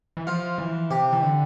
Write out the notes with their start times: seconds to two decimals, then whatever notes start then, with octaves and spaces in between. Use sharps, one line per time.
0.17 E3
0.27 F3 F4
0.58 E3
0.91 C3 G4
1.13 E3
1.22 D3